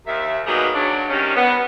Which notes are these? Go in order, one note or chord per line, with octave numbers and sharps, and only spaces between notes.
D#2 D#3 E5
F#3 G3 A#3 B3 D#4 G#4
C#3 F#3 D4
C3 D#3 G3 C#4
B3